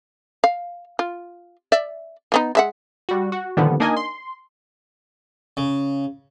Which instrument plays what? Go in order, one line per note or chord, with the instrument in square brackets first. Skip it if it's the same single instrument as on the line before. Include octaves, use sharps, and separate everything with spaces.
[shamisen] F5
F4
D5 E5
F3 B3 D#4
G#3 E5 F#5
[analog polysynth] G3 F#4
F#4
A#2 D3 D#3 F3 G3 B3
A#3 D4 D#4 A#4 D#5 G#5
C6
[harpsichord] C#3